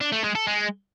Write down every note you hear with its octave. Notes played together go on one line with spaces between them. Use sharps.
D4
A3
G#3
A4
G#3